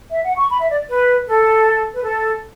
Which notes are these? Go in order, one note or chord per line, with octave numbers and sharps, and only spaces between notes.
E5
F#5
C#6
B5
E5
D5
B4
A4
B4
A4